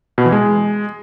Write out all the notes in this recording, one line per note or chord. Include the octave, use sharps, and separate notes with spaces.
B2
E3
G#3